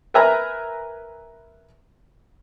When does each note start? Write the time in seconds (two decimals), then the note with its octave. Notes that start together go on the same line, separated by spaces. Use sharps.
0.14 A#4 B4 E5 G#5 A#5